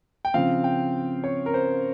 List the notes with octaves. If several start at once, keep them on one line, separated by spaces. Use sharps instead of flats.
G5
C#3 F3 C4 F5
G5
C#5
A#4
C5